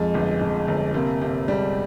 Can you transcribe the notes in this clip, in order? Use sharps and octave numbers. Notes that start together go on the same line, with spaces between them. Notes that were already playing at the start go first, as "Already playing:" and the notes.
Already playing: F2 G#3
G1
F2
G1
C3 A#3
C3
G3 G#3